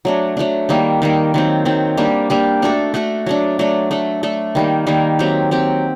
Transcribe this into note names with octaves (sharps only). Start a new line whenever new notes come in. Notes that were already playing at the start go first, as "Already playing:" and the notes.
F#3 A3 D4
F#3 A3 D4
D#3 G3 A#3
D#3 G3 A#3
D#3 F#3 C4
D#3 F#3 C4
G3 A#3 D4 G4
G3 A#3 D4 G4
A3 D4 F#4 A4
A3 D4 F#4 A4
F#3 A3 D4
F#3 A3 D4
A3 D4 A4
A3 D4 A4
D#3 G3 A#3
D#3 G3 A#3
F#3 C4 G4
F#3 C4 G4